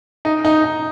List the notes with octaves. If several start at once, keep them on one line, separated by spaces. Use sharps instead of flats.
D#4
D#4
D#4